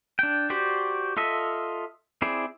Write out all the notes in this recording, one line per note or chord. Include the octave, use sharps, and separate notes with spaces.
D4 G5
F#4 G4 C5 D5
F4 A4 D#5 E5
C4 E4 G#4 D5